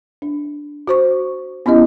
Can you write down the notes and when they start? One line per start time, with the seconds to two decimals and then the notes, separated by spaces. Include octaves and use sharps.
0.22 D4
0.87 F#4 C5 C#6
1.66 B3 C#4 E4 G4 D#5